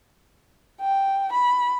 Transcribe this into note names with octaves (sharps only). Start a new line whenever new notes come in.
G5
B5